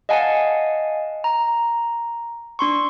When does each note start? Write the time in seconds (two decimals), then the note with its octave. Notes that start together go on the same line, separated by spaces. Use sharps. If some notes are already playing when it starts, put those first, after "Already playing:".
0.09 D#5 F5 F#5 G#5 A5
1.24 A#5
2.59 D4 C6 C#6